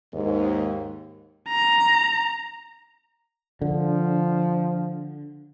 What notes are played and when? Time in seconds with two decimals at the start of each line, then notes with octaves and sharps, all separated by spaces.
0.13 D#2 G#2
1.49 A#5
3.62 D3 F3